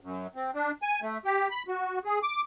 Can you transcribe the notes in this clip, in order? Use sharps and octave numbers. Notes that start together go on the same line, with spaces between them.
F#2
C4
D4
G#5
A3
G4
B5
F#4
G#4
D6